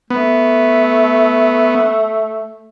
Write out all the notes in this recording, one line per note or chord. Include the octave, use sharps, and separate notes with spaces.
A3 B3